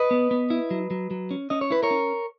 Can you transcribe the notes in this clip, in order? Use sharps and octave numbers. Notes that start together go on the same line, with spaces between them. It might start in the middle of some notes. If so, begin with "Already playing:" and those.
Already playing: B4 D#5
B3
B3
E4
F#3
F#3
F#3
C#4
C#4 D#5
C#5
E4 B4
A#4 C#5
C#4